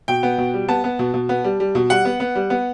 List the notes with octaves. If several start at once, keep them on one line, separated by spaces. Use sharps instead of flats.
B2 G5
B3
B2
G3
B3 A5
B3
B2
B2
B3
G3
G3
B2
G3 F#5
B3
B3
G3
B3